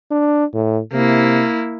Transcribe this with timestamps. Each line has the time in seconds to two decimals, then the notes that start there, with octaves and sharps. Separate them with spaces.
0.11 D4
0.54 A2
0.93 C3 A#3 E4